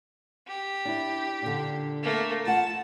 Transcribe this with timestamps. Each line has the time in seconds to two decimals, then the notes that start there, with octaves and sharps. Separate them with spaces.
0.47 G4
0.85 D4 E4
1.42 A#2 D3
2.03 A3 A#3
2.45 A3 F4 F#5 A5